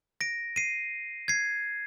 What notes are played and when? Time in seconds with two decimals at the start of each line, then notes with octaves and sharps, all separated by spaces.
0.21 A#6 D7
0.56 C7 D#7
1.28 G#6 C7